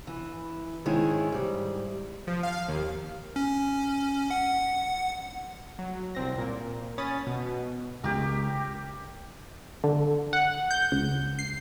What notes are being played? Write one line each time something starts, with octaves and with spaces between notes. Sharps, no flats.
E3
G#2 D#3 G#3 C#4 E4
G#2 G3
F3
F5
D#2
C#4
F#5
F#3
C2 C4 A#6
A#2 A#4
C#4 B5 D#6 A6
B2
C#2 G4 A#4
D3
F#5
G6
C#2
C7